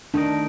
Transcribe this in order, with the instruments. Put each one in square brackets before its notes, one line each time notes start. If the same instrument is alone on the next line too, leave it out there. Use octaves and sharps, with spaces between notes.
[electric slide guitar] D#3 A3 D#4 A#4 [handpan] D4